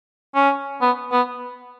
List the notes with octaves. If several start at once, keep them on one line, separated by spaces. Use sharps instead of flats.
C#4
B3
B3